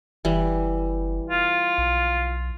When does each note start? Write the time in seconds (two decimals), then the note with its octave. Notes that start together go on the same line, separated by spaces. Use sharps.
0.25 F#1 E3 G3
1.30 F4
1.78 B1